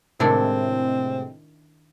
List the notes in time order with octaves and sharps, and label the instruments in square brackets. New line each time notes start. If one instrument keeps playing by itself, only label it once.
[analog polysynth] A2 C3 G#3 [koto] D#3 D4 E4 [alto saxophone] C4